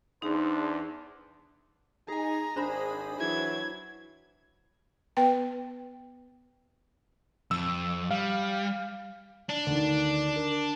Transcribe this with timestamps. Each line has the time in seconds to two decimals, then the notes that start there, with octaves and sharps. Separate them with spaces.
0.22 E2 D4 D#4 G#4 C5
2.08 D#4 G#4 G#5 A#5
2.56 G#1 D4 G#4 C5 B5
3.18 E3 F#3 E4 G#6
5.17 B3 B4 G5
7.51 F2 E6
8.11 G3 F5
9.49 D4
9.67 D2 D#3
10.36 A#4